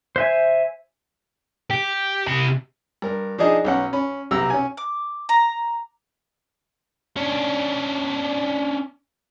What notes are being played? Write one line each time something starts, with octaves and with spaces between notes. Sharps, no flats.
C5 E5 G#5
G4
C3 B5
G2 A#4
F3 D4 D#4 G#4 D#5
B1 C#4 F#5
C#4 B5
B1 C3 A#5 E6
C#4 G#5
D6
A#5
C#4 D4